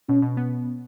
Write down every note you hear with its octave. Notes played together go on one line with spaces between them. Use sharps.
B2 C#4
B2
B3